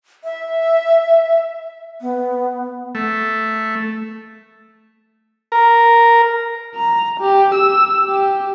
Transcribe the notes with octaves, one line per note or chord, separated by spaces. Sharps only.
E5
B3
A3
A#4
A#5
G4
E6
G4